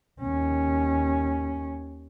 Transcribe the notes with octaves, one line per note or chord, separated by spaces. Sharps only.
D#2 C#4